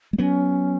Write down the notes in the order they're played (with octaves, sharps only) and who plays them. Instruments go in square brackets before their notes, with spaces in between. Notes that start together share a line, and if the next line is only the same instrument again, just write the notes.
[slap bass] G#3
[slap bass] F#3 B3 [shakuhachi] C#4